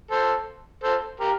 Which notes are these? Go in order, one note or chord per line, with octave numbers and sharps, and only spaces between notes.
A4 C5
A4 C5
G4 A#4